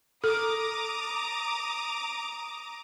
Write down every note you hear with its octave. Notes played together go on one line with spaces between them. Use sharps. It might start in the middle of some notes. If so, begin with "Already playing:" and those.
A4 A#5 D6 D#6